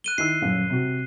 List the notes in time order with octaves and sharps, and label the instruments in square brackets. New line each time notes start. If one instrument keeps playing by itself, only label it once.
[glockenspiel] F#6 D#7 G7
[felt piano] D#3 E4 E6 [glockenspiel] C7
[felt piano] D#1 F#2 F5
C3 F#4